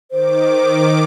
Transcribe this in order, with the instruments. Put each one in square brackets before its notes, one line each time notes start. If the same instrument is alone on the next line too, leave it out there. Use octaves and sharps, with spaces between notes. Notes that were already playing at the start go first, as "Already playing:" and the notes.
[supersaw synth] D#3 D6 [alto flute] C5